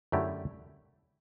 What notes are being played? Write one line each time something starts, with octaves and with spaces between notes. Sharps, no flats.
F#2 D3 A3 E4 G4